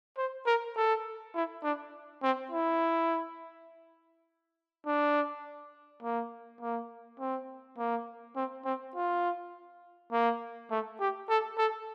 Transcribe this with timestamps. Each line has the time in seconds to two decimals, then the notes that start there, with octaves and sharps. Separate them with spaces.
0.18 C5
0.46 A#4
0.76 A4
1.35 E4
1.63 D4
2.23 C4
2.51 E4
4.86 D4
6.03 A#3
6.61 A#3
7.20 C4
7.78 A#3
8.36 C4
8.65 C4
8.95 F4
10.12 A#3
10.71 A3
11.00 G4
11.29 A4
11.58 A4